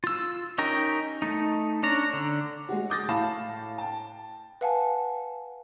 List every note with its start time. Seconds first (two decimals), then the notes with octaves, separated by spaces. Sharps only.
0.04 F4 E6
0.58 C#4 D#4 G4 A#4
1.22 A3 D#4
1.83 C#4 D4 A#5
2.13 D3
2.69 G#3 F#4
2.90 D6 D#6 G6 A6 A#6
3.08 A2 A3 F5 A5 B5 E7
3.78 G5 A5
4.61 B4 F5 F#5 G#5 A5